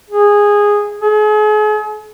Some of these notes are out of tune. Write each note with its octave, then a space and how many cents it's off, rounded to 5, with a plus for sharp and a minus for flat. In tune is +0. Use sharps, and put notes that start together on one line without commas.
G#4 -10
G#4 +40